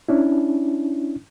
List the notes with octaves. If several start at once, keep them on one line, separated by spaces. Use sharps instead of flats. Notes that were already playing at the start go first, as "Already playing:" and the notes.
C#4 D4 E4